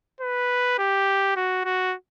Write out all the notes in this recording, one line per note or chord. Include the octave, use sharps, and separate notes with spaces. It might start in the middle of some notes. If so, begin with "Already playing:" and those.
B4
G4
F#4
F#4